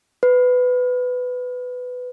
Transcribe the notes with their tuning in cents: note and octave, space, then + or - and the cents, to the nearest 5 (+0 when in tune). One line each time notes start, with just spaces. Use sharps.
B4 +15